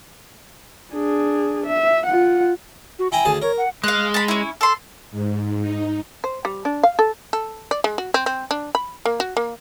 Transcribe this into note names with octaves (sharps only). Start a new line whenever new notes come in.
D4 G#4
E5
F4 F#5
F#4
E4 G5 G#5 A#5
D2 G#4 A5
A#4 C#5
F#5
G#3 F5 F#6
A5 B5
C#4 E4
A4 C6
G#2
D#4
C5
G3
D4
F5
A4
A4
D5
G#3
F#4
C4
C4
D4
B5
A#3
F#4
A#3